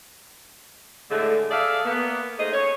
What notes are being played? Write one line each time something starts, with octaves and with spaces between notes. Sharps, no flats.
A2 D3 G#3 A3
G#4 A4 D5 E5 F5
A#3 B3
A3 D#4 G#4 C5 D#5
C#5